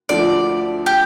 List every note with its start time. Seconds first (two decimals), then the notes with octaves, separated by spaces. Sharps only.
0.09 D2 D3 F3 A3 D4 D5
0.86 G4